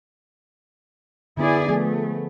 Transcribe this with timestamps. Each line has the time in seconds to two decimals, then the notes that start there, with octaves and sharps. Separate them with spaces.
1.37 D3 B3 E4 G#4 D5
1.69 F3 A3 B3 G#4